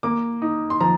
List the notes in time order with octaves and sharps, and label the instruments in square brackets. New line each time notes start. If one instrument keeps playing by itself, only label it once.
[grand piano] A#3 D6
D#4
C6
F3 A#5